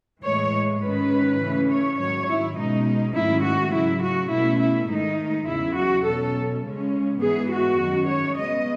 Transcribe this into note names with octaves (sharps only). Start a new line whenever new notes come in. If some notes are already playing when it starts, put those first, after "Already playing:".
A2 E3 G#3 C#5
G#2 D#3 G#3 C#4 B4
C#3 E3 A3 C#4
C#5
G#2 D#3 F#3 C#5
E4
B2 G#3 C#4 D#4
G#2 D#3 F#3 A3 C#4 E4
F#4
C#3 F#3 C#4 E4
F#4
B2 A3 C#4 E4
E4
G#2 D#3 A3 D#4
E2 C#3 F#3 E4
F#4
B2 F#3 C#4 A4
C#3 G#3 C#4
G#2 E3 B3 G#4
F#4
F#2 D#3 G#3 C#4
C#5
C#3 G#3 B3 D#5